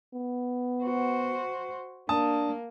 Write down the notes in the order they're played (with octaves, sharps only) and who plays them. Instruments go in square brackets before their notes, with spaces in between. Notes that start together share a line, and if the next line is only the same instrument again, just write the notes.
[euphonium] B3
[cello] F#4 C5
[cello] A#3 [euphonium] D4 [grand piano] A5 D#6